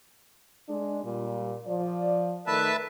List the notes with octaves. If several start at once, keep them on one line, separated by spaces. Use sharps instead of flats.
G#3 D4
A#2 G3
F3 D5
D#3 A3 A#4 B4 E5 A5